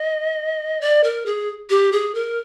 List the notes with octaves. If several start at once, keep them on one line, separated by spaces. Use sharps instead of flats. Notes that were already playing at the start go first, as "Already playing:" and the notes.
Already playing: D#5
D5
A#4
G#4
G4
G#4
A#4